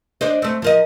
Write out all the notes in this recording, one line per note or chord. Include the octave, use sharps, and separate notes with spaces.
D4 C5 D#5
A3 C4
F3 A#4 D#5